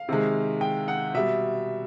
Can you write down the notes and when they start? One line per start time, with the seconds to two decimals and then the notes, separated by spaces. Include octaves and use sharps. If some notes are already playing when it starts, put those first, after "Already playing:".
Already playing: F5
0.09 C3 D#3 G#3
0.61 G5
0.88 F#5
1.14 B2 G3 E5